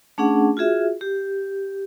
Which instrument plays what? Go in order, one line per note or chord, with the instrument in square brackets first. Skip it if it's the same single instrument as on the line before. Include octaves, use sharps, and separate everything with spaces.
[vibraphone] A3 C#4 D4 G#4 F#5
F4 F#4 G#4 E5
G4